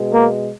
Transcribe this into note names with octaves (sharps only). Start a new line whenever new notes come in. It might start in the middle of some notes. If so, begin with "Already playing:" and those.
Already playing: B2 G#3
A#3